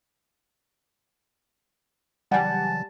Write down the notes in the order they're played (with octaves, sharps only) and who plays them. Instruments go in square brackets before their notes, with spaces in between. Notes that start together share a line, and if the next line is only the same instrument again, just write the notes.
[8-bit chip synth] C#3 E3 F#3 [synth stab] G3 [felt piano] F#5 G#5 [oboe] A5